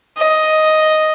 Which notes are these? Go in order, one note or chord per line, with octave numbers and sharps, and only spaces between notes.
D#5